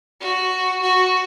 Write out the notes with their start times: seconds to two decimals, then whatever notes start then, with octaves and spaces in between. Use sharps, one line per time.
0.20 F#4
0.82 F#4